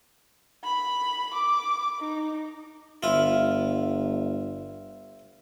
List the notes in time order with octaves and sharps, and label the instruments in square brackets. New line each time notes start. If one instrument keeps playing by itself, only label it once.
[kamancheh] B5
D6
D#4
[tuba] G1 [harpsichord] E4 F4